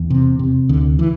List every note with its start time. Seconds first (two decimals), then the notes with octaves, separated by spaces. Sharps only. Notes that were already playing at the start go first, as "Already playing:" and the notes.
Already playing: E2
0.10 C3
0.39 C3
0.69 D2 D3
0.99 E3